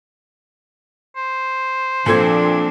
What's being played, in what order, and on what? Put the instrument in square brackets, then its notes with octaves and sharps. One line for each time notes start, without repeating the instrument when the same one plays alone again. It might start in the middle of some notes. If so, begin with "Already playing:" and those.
[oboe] C5
[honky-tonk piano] A#2 G#6 [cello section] F3 C4 D4 [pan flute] A4